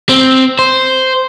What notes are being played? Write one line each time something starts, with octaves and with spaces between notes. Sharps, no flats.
C4
C5